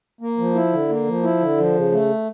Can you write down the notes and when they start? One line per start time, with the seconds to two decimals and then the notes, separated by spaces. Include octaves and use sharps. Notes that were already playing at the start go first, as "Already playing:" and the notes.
0.21 A#3
0.38 F3
0.55 E4
0.72 D3
0.89 A#3
1.07 F3
1.23 E4
1.40 D3
1.58 F3
1.75 C#3
1.92 A3